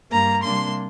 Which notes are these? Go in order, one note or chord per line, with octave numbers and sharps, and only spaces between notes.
G2 G3 A#3 A#5
C3 G3 A#3 D4 C6